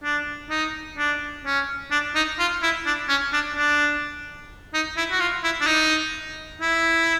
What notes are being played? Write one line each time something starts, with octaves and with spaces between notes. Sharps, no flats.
D4
D#4
D4
C#4
D4
D#4
F4
E4
D4
C#4
D4
D4
D#4
E4
F#4
F4
E4
D4
D#4
E4